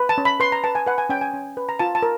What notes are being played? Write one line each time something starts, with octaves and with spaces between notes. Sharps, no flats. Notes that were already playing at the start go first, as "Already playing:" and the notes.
Already playing: B4
A5
C#4
B5
B4 C6
A#5
B4 A5
G#5
B4 F#5
G#5
C#4 G5
G#5
C#4
B4
A#5
F4 A5
A5
A#4